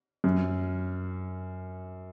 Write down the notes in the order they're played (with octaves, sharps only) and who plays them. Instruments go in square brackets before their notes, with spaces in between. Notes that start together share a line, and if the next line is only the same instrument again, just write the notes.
[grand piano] F#2